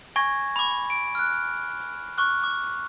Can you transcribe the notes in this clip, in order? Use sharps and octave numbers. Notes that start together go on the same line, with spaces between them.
G#5 C#6 G#6 A#6
B5 D6
D7
F6 F#6
C#6 D6 F6 F#6
D6